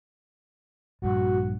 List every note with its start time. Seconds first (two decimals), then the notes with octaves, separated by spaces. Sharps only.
1.02 A#1 G2 F#4